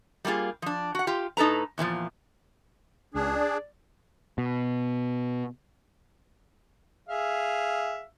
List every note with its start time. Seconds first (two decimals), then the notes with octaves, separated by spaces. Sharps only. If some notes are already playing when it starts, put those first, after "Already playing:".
0.25 G3 A3 A#3 F4 G#4
0.62 F3 D4
0.95 F#4 F#5
1.07 F4 G4
1.37 A2 D#4 A4 B4 A#5
1.78 E2 A#2 D#3 F3
3.14 C#2 D4 G#4
3.35 D5
4.38 B2
7.09 G#4 E5 F5